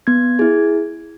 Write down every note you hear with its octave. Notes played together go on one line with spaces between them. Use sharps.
B3 G#6
E4 G#4